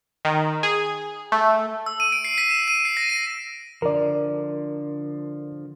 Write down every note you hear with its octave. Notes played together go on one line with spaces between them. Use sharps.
D#3
G#4
A3
E6
D#7
D7
C7
B6
E7
D#7
C7
A#6
D#7
D3 F3 A#4 D5